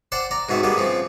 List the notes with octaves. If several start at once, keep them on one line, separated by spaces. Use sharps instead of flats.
C5 D5 F#5 G5 A5
D5 A#5
G#2 B2 C4 E5
G3 G#3 A#3 B3
C#3 F3 C4